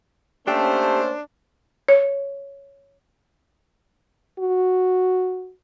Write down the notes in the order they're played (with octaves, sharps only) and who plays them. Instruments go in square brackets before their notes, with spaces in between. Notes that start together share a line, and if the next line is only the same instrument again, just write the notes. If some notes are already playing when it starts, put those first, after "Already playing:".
[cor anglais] A3 [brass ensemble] A#3 C#4 C5 [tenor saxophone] D4 [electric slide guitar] G4 F5 G5
[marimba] C#5
[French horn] F#4